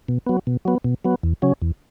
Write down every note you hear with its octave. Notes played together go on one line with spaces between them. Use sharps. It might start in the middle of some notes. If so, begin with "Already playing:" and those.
B2
F#3 B3
B2
F#3 B3
B2
F#3 B3
E2
C#3 F#3 C#4
E2